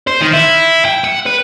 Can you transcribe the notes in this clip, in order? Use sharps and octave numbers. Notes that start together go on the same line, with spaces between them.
C5
D#3
E4
G5
F#5
B4